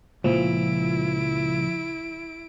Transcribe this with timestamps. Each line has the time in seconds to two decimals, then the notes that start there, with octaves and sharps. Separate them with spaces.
0.24 C#2 A#2 F3 E4 D7